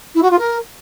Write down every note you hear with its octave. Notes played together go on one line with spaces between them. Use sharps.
E4
F#4
F4
A#4